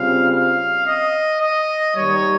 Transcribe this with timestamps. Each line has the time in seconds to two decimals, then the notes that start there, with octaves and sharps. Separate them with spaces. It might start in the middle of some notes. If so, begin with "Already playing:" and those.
Already playing: C#3 G3 C4 F4 F5
0.32 F5
0.87 D#5
1.41 D#5
1.96 D#2 D#3 G3 C#5